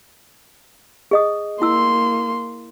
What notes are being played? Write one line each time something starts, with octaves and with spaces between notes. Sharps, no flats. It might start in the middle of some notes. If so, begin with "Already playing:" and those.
G#4 D#5 D#6
A#3 E4 C6 E6